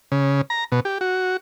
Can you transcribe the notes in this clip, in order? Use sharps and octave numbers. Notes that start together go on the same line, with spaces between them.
C#3
A#5
B2
G4
F#4